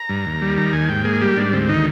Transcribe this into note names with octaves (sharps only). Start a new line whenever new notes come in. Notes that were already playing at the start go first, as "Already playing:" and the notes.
Already playing: A#5
G2
D#2
G3
D#3 A#5
D#2 G#5
G#2 G5
A#3 G#4
G3 G4
G#2 D4
D2 C4
D#3 D#4